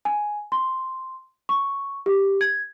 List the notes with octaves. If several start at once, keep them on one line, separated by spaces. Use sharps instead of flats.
G#5
C6
C#6
G4
G#6